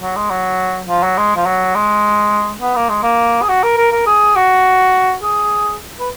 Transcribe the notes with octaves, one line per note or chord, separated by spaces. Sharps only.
F#3
G#3
F#3
F3
F#3
G#3
F3
F#3
G#3
B3
A#3
G#3
A#3
G#4
F#4
A#4
A#4
A#4
G#4
F#4
G#4
B4